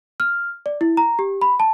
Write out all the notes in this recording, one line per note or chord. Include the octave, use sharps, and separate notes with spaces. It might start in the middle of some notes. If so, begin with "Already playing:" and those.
F6
D5
E4
A#5
G4
B5
A5